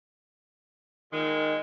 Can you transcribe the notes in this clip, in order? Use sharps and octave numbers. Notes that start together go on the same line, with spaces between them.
A#2 D#3 G#3